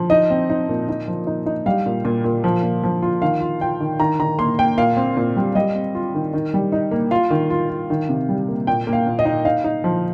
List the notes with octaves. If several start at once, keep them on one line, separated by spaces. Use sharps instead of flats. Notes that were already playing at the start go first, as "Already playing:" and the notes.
Already playing: F3
D#4 D#5
C4
D#4
A#2
D#4
F3
D#4
D#4
G3 F5
A#2
A#2
A#2
F3
A#2
F3
F4
D#3 F5
F4
F4 G5
D#3
D#3 A#5
D#3 A#5
A#3 C6
A#3 G5
A#2 F5
C4
A#2
G3
G3 D#5
C4
F4
D#3
D#3
G3
D#4
A#3
F4 F5
D#3
F4
F4
D#3
C3
G3
A#3
A#2 G5
A#3
F5
A#2
D#5
D#4
D#4 F5
D#4
F3